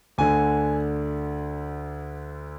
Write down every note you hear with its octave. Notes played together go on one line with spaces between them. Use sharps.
D2 D3 G#5